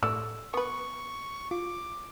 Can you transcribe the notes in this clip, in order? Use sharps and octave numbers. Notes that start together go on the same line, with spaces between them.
A2 A3 D5 E6
B3 B4 C#6
F4 D6